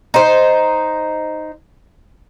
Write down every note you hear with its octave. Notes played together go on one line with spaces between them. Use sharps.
D#4 C5